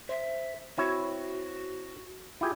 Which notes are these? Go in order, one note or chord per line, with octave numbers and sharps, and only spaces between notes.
C5 E5
C4 E4 F#4 C#5
E4 F4 G4 G#4